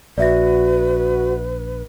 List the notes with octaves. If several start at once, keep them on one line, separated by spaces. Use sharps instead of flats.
A#1 F#4 B4 D5 E5 A#6